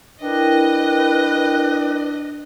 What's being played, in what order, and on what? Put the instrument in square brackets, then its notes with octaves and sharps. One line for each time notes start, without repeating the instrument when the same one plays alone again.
[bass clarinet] D4 [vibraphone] E4 A#4 G5 [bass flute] B4 [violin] D#5